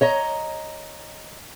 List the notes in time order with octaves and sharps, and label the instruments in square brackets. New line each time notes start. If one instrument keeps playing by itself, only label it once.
[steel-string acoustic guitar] C#5 D#5 A#5